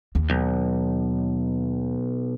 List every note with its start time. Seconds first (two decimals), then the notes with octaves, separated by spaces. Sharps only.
0.15 D#2
0.30 B1